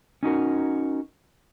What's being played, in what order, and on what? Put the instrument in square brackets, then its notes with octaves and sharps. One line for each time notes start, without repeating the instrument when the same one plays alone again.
[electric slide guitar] C#4 D#4 F#4 A#4